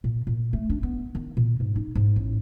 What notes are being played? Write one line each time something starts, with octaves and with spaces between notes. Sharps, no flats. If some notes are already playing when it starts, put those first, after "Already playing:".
A#2
A#2
A3
D4
B3
D#3
A#2
G#2
D#4
G#2
A1